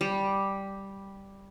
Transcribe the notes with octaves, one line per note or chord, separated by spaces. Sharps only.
G3